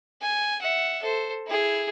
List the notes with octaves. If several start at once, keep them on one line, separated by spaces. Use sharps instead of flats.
G#5
E5 F#5
A4 C5
E4 G#4